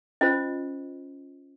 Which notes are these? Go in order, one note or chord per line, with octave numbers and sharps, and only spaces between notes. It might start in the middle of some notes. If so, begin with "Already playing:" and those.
C#4 F4 C5 D#5